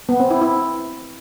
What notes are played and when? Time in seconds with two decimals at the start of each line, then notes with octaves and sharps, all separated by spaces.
0.09 B3
0.20 C4
0.31 E4
0.41 E4